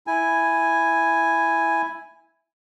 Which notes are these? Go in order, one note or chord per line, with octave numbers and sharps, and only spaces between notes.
E4 G#5